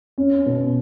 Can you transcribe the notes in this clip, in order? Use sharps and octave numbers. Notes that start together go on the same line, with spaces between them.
C#4
B2